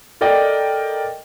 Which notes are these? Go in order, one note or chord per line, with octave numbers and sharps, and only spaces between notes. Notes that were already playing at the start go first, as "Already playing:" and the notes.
A4 A#4 D5 D#5 G5